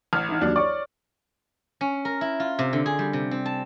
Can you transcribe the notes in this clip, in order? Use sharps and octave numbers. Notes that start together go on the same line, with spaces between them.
A1 F6
E3 D#4
D#2 F#3 D4
C#5 D5 C#6 D6
C#4
A#4
E4
F4
C3
D3
G#4
G3
C3
C4
A5